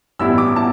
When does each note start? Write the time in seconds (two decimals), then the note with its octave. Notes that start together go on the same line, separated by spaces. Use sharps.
0.19 A1 G2 G3 B3 E4 E6
0.38 D6
0.56 B3 E4 A5